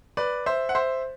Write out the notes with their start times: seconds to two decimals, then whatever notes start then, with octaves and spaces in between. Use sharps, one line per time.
0.17 B4 D5
0.46 C5 E5
0.69 F#5
0.75 C5 E5